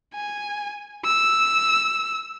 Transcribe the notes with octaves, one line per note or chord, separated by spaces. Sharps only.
G#5
E6